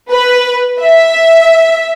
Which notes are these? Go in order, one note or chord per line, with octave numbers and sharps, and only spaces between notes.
B4
E5